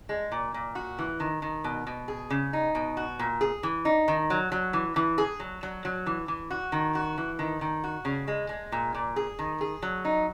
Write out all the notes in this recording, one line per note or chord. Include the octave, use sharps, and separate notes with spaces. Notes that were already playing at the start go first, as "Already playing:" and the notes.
G#3
A#2
A#2
F#4
E3
D#3
D#3
B2
B2
G#4
C#3
D#4
B2
F#4
A#2
G#4
E3
D#4
D#3
F#3
F#3
E3
E3
G#4
F#3
F#3
F#3
E3
E3
F#4
D#3
F#4
E3
D#3
D#3
F#4
C#3
G#3
G#3
A#2
A#2
G#4
D#3
G#4
F#3
D#4